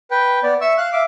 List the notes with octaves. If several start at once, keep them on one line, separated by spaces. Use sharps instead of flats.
B4 G5
B3 D5
E5 C#6 E6
F5 F#6
E5 F5 D6